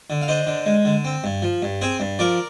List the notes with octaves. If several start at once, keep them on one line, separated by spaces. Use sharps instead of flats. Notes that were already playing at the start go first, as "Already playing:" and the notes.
D3
F5
D4 C5 D#5
D3
G#3
D3
C4
G2
F3
G2
C4 G#4 C5
G2
F3 A#4 D5